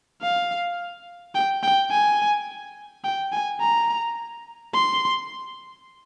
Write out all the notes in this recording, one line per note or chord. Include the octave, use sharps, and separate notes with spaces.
F5
G5
G5
G#5
G5
G#5
A#5
C6